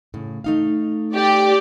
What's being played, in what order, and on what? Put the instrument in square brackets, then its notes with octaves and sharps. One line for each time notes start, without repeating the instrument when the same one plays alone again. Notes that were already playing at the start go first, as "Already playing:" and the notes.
[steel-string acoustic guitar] A2 C#3
A3 D#4 F5
[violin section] G4 D5